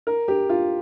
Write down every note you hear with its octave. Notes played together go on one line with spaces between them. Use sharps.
A#4
G4
F4